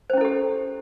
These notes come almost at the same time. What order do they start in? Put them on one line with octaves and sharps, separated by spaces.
C5 C#4 E4 A4 G4